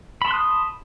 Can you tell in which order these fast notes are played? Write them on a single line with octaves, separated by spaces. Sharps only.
B5 A5 C6 F#6 D#6